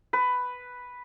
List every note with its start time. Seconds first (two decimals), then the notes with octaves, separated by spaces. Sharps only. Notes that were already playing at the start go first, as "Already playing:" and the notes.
0.13 B4